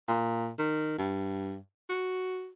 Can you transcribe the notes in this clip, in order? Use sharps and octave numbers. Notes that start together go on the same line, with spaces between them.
A#2
D#3
G2
F#4